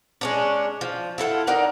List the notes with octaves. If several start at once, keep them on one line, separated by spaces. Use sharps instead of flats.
G#3 C#4 D4
F3
E4 F4 A4 F#5
D#4 A#4 D5 F#5